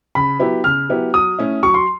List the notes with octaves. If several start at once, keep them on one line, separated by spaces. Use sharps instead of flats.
C#3 B5
F#3 B3 E4 G4
C#3 F6
F#3 B3 E4 G4
F#3 D#6
A3 C#4 E4
F#3 C#6
C6